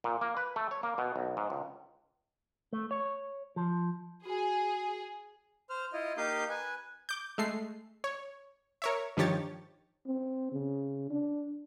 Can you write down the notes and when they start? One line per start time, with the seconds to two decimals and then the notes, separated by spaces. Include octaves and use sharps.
0.04 A#2
0.21 A#3
0.37 B4
0.56 A3
0.71 C#5
0.83 A#3
0.98 B2
1.16 B1
1.37 G#2
1.50 C#2
2.73 A3
2.91 C#5
3.56 F3
4.26 F#4 G#4 G#5
5.70 C5 F6
5.93 E4 F4 D#5
6.17 A#3 D#4 G4 F5 D#6 G6
6.49 B4 G#5
7.09 D6 G6
7.38 G#3 A3 C7
8.04 C#5
8.82 A#4 C#5 E5
9.17 G2 D#3 F3 G4 C#5 A6
10.06 C4
10.52 C#3
11.10 D4